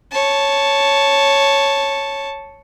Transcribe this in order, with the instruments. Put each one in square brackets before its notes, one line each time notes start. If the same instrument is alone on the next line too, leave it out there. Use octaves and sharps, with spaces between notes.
[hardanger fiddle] C#5 A5